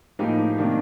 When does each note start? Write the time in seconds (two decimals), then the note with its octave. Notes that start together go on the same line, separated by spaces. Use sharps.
0.19 A2 F3 A#3 D#4 G4
0.58 C3 D#3 A#3 D4